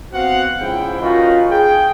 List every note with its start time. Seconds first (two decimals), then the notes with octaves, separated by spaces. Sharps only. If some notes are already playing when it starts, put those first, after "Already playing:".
0.12 B3 C4 F#4 F5 F#5
0.59 G#2 C#3 F3 E4 G5
1.00 C#4 D#4 F4 F#4 A#4 B4
1.50 G#4 G5